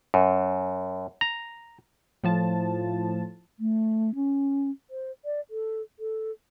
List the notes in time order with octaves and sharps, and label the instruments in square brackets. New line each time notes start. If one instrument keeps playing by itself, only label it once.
[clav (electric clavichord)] F#2
A#5
[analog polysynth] A2 F3 A5
[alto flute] A3
C#4
C5
D5
A4
A4